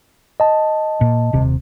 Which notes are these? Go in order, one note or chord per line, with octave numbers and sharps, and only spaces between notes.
D#5 A5
A#2
D#1 C3